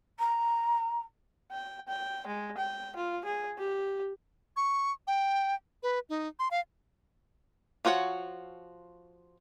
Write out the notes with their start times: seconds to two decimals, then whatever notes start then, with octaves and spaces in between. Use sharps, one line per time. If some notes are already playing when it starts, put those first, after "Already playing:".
0.19 A#5
1.52 G5
1.88 G5
2.27 G#3
2.57 G5
2.96 F4
3.25 G#4
3.58 G4
4.57 C#6
5.07 G5
5.83 B4
6.09 D#4
6.39 C6
6.51 F5
7.85 F3 F4 F#4 C#5 F#5